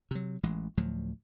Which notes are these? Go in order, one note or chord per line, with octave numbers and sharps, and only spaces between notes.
C3 F#3
A1 E3 G#3
D2 A2 F3 F#3